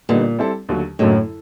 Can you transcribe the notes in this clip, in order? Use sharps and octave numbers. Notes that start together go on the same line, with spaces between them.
A#2 D3 G3 B3 D#4
G3 C4 E4 A4
D#2 D3 F#3 A3
F#2 A2 D3 F#3 A#3 D#4